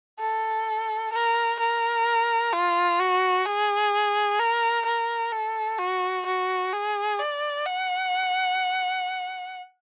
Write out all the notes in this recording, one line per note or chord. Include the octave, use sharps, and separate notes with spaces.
A4
A#4
A#4
F4
F#4
G#4
A#4
A#4
A4
F#4
F#4
G#4
D5
F#5